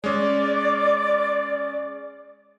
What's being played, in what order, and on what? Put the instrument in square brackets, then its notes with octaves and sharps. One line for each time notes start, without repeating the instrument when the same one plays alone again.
[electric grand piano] G#3 C#4 [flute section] D5